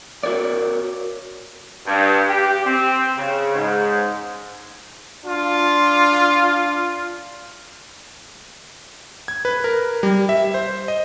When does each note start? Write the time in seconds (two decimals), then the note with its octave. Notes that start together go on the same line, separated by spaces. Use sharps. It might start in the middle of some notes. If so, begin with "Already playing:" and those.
0.23 F#4 A#4 C#5 D5
1.86 G2
2.29 G4
2.65 C4
3.17 C#3
3.54 G#2
5.25 D4 F4
9.28 G#6
9.45 B4
9.64 A#4
10.03 G3
10.29 E5
10.54 C5
10.88 D#5